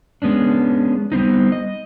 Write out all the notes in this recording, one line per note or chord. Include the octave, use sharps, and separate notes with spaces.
G#3 B3 C#4 D4
G3 B3 C4 D#4
D#5